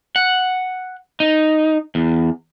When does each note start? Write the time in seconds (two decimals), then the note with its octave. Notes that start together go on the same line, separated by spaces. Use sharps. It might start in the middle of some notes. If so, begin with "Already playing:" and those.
0.16 F#5
1.20 D#4
1.95 E2